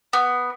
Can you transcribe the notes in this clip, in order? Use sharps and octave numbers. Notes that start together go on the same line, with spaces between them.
B3